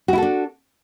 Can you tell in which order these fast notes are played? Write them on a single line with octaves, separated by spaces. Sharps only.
F#4 E4 A4 D4